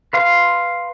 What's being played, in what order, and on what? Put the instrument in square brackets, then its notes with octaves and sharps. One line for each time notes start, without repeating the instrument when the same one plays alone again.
[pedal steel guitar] B4 F5 C6